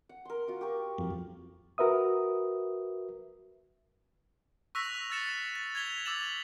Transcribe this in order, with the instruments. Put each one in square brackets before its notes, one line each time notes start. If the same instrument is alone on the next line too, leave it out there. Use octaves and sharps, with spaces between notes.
[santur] F#5
A#4 C6
F4 F#4 D6
G4 A#4 C#6
[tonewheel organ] F2
[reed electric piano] F#4 A#4 B4 E5 D#6
[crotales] C#6 E6 F#6 A#6 B6 F7
E6 F6 A6 C#7 E7
A6
G#6 A6 B6 F7 G7
D6 E6 A6 E7 F#7